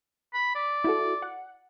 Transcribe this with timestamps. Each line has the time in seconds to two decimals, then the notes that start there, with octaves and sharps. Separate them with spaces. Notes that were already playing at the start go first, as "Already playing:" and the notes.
0.34 B5
0.55 D5
0.84 E4 F#4 A4
1.22 F#5